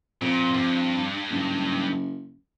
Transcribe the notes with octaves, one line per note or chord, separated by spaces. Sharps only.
F2 A#2
G2
F#1